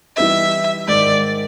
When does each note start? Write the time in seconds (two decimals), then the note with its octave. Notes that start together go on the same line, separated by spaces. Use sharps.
0.17 E3 G3 B3 D#4 E5
0.88 G#2 D#3 G#3 D5